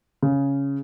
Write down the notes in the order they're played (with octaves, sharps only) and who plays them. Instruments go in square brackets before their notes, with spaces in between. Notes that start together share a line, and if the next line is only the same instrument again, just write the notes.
[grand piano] C#3